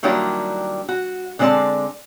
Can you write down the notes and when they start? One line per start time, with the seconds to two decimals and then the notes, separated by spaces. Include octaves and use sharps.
0.03 D#3 F#3 G3 A#3 D4 E4
0.89 F#4
1.39 D3 G#3 C4 F#4 D5 A5